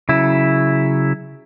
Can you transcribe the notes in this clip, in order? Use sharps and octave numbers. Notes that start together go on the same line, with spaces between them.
C#3 F#3 E4